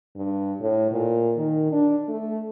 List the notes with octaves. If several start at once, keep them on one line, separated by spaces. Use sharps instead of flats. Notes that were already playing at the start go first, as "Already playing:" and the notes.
G2
A2
A#2
D#3
D4
A3